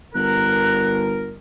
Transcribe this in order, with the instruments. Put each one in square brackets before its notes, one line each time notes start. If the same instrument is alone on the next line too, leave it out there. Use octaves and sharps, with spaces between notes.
[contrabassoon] G1 [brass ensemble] A#4 [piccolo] F#6